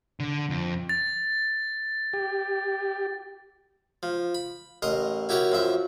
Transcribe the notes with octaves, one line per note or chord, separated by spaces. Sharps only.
D3
F2
A6
G4
F3
B5
A1 A#4 D#5 C6
E4 F#4 G4 A#4 C#5
F#2 F3 E5